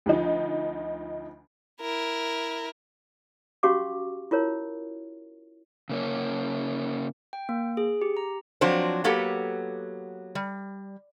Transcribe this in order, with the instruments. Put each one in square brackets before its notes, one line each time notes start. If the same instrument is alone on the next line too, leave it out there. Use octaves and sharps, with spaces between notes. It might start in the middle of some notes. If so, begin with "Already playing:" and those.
[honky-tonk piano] D2 F3 D#4
[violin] E4 A#4
[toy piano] C#4 F#4 G4 F5 C#6 D6
E4 F4 A#4 C#5
[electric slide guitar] C#3 A#3 C#4
[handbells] G5
A#3
G#4
G4
A#5
[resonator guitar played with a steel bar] F3 F#3 C4 D4 C5
F#3 A#3 B3 G4 A4
G3